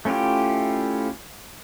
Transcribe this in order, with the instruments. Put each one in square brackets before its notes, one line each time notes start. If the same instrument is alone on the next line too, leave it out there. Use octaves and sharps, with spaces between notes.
[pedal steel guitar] A3 C#4 E4 F4 G4